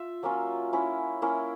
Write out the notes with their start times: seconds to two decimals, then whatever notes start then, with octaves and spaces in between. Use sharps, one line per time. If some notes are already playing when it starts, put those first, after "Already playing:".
Already playing: F4 E5
0.23 F#3 A#3 C#4 F4
0.73 A#3 C#4 E4
1.22 A#3 C#4 E4